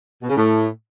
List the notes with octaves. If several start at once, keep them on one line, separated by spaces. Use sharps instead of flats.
B2
C#3
A2